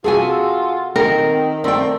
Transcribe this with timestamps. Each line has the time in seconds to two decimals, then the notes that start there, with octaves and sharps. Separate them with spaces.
0.04 C3 F4 F#4 G#4 A4 G#5
0.96 D#3 C4 A#4
1.64 A3 C4 A#4 D5 G5